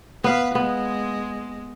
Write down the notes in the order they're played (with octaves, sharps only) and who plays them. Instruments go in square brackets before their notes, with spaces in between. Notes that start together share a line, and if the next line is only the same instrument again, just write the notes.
[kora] B3 F5 [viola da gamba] B4
[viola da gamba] G#3 [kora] B3